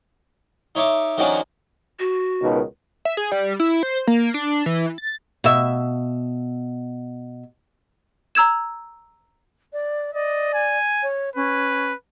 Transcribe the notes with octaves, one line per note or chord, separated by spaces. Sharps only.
D#4 C#5 E5 D6
D#3 F3 F#3 A#3 C#4 D4
F#4
C#2 B2 D#3
E5
G#4
G3
E4
C5
A#3
D4
E3
A6
B2 E5
A#5 E6 G#6 E7
D5
D5 D#5
G#5
C#5
C#4 B4